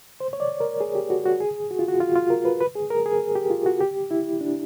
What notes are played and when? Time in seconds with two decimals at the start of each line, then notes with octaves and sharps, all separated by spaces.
0.20 C5
0.33 C#5
0.40 D5
0.60 A#4
0.81 G#4
0.95 G4
1.10 F#4
1.25 F#4
1.40 G#4
1.71 F#4
1.79 F4
1.88 F#4
2.00 F4
2.16 F4
2.30 A#4
2.45 B4
2.61 B4
2.75 G#4
2.91 A#4
3.06 G#4
3.35 G4
3.50 F4
3.66 F#4
3.81 G4
4.11 E4
4.41 D4